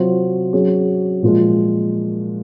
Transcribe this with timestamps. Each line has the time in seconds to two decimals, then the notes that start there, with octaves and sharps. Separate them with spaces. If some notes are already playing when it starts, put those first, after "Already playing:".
Already playing: C3 F#3 C4 F4 C5
0.53 F#3 C#4 G#4
1.22 A#2 F3 G#3